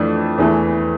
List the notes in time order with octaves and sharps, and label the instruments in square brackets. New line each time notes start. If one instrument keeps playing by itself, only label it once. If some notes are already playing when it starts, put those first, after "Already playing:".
Already playing: [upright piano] F2 E3 A3 D4
E2 E3 A3